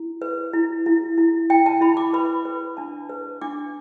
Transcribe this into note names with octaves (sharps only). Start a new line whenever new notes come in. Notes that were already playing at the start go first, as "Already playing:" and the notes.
Already playing: E4
B4
E4
E4
E4
E4 G5
A5
E4 B5
D6
B4 B5
B4
D4 A5
B4
D4 D6